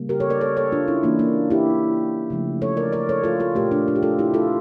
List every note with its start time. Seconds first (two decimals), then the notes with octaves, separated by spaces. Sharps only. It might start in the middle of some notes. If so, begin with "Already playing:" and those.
Already playing: C#3 G3 A#3
0.09 G4 A#4
0.20 A4 C#5
0.30 A#4 D5
0.41 A4 C#5
0.57 A4 C#5
0.72 D4 F4
0.88 C#4 E4
1.03 E3 A#3 D4
1.19 A#3 D4
1.50 E4 G4
2.30 C#3 F3 A3
2.62 A4 C#5
2.77 A#4 D5
2.92 A#4 D5
3.09 A4 C#5
3.24 F4 A4
3.40 F4 A4
3.55 A#2 A3 G4 A#4
3.71 D4 F4
3.88 D4 F4
3.96 G4
4.03 F4 A4
4.19 E4 G4
4.34 F4 A4